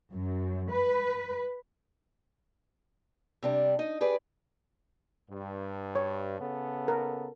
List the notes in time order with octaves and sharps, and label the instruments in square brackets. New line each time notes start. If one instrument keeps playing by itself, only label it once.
[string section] F#2
B4
[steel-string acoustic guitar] C3 G3 D4
D#4 D#5
G4 G#4 B4 D5
[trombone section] G2
[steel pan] C#5
[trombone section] C#3 B3 A4
[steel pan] A#4